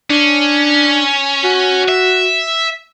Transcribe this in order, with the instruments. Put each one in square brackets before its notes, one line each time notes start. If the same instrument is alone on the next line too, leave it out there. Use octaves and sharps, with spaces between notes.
[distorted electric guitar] C#4 [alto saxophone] D4
[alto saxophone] F#4
[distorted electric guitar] E5